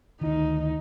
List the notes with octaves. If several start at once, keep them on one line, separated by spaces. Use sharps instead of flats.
D2 D#3 D#4